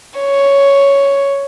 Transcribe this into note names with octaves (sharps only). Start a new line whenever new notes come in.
C#5